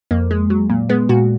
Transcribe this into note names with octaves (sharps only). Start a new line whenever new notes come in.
F2 A#3
G#3
F#3
A#2
G#3 B3
A#2 F#4